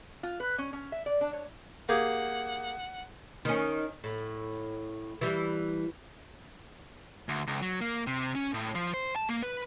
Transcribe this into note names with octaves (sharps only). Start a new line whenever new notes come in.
F4
B4
C#4
C#4
E5
D5
D4
C#5
A#3 G4 G#4 F#5
D#3 C#4
A2
E3 G3
D2
C#2
F#3
A#3
C3
C#4
A2
F3
C5
A5
A#3
B4